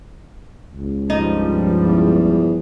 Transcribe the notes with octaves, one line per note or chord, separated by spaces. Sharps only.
C#2
G2 F3 G3 D#4
E2